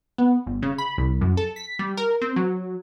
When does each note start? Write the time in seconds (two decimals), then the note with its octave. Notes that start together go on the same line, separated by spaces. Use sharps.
0.18 B3
0.46 G1
0.62 C#3
0.78 B5
0.98 C2
1.21 F#2
1.37 A4
1.56 B6
1.79 G3
1.97 A#4
2.22 C4
2.36 F#3